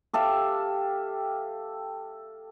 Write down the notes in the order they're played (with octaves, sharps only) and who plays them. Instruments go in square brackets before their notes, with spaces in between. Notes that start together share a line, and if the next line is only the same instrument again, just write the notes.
[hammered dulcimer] G4 A4 E5 F5